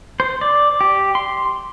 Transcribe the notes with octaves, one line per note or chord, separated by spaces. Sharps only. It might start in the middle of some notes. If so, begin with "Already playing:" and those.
C5
D5
G4
C6